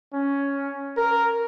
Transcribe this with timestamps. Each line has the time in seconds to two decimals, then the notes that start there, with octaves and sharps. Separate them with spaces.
0.13 C#4
0.97 A#4